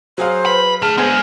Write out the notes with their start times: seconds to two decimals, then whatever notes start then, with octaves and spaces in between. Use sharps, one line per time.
0.18 F#3 G#4 C5 F5
0.46 B4 B5
0.82 D3 A3 G#4 F6
0.98 D3 G#3 B3 C5 G#6